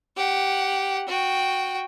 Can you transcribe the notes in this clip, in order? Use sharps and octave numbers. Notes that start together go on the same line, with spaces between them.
G4 F#5
F#4 G5